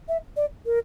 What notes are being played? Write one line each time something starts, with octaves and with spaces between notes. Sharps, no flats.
E5
D5
A#4